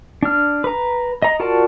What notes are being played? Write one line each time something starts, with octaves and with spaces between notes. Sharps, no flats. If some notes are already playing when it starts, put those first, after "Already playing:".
D4 F6
B4 A#5
D#5 A#5
F4 F#4 A#4 D5 A5